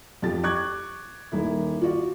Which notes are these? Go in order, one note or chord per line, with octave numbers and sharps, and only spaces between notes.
F2 G4 A6
C#6 D6 F#6 G#6
D#1 D#3 E4
F4 F#4 D5